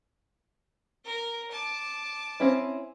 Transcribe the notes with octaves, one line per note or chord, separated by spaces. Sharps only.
A#4
A5 D6
C4 C#4 E4